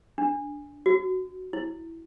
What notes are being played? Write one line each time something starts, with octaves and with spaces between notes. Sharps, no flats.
D4
F#4
E4